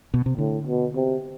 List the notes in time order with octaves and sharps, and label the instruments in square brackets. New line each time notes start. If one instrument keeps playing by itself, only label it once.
[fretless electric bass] B2
C3
[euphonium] A2 [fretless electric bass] D3
[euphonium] B2
C3